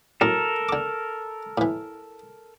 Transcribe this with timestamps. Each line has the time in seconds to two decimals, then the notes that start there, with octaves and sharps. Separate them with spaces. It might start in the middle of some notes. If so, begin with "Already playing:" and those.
0.21 F#2 A2 A4 A#4
0.69 D3 D6
1.58 A2 E3